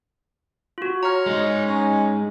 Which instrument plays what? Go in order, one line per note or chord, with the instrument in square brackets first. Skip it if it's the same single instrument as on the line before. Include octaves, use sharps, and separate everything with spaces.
[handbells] F4 F#4
[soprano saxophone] C#5 [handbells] A#5 F6
[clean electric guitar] G#3 D#4
[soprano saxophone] C#4